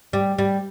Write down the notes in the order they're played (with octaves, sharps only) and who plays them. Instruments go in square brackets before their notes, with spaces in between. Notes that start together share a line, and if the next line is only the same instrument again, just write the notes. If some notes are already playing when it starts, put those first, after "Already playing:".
[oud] G3
G3